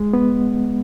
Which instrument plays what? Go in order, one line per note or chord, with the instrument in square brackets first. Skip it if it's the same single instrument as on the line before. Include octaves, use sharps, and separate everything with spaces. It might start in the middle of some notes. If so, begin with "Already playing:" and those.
Already playing: [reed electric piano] G#3
B3